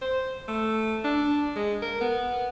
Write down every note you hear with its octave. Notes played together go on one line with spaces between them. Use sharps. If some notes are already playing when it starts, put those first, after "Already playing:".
C5
A3
D4
G#3
A#4
B3